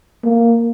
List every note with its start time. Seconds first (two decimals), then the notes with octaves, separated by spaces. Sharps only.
0.24 A#3